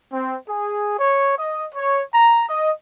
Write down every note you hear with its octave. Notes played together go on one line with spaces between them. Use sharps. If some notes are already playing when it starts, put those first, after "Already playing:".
C4
G#4
C#5
D#5
C#5
A#5
D#5